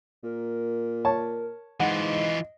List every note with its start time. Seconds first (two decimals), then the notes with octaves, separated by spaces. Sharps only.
0.24 A#2 A#4
1.05 C#5 A5
1.80 G#2 E3 F4 D#5 F#5